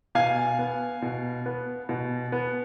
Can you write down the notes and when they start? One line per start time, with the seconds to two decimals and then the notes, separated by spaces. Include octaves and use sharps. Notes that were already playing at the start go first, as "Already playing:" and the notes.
0.15 B2 F5 G#5
0.59 B3
1.02 B2
1.46 B3
1.89 B2
2.32 B3